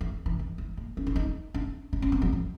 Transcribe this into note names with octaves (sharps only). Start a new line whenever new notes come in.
E3
E3
D#3
E3
A#3
C#4
D4
D#4
D4
D4
C#4
C4
F#3
F3